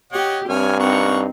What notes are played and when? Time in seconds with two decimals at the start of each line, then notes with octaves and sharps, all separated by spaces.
0.13 G4 C#5 D#5 F#5
0.49 G2 C4 C#5 G#5 F6
0.79 C4 D#4 A#4 F#5 C#6